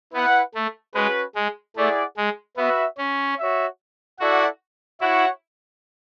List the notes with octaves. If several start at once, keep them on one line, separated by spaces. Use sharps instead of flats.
B3 E4 B4 F#5
A3
G#3 C#4 F#4 B4
G#3
A3 E4 G#4 D5 F#5
G#3
B3 F#4 B4 E5
C#4
F#4 C#5 E5
E4 F#4 A4 D5 F#5
E4 F#4 C#5 F#5